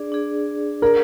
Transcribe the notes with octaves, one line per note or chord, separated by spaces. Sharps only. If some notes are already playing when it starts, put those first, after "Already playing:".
Already playing: D4 G#4 D5
D4 G#4 D5
D4 G#4 A#4 D5